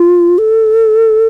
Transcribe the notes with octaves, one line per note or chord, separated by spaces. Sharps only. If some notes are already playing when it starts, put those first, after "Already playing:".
Already playing: F4
A4